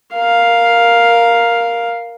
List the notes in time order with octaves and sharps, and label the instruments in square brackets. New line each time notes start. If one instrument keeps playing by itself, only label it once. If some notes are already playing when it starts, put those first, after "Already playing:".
[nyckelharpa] A#4 F5